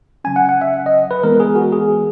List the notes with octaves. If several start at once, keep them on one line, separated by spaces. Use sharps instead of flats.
C#3 F#3 C#4 G#5
F#5
F#5
E5
D#5
B4
E3 G#3 B3 A#4
G#4
F#4
G#4